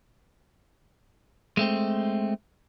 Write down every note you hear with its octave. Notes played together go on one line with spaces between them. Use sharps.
G#3 A3 C4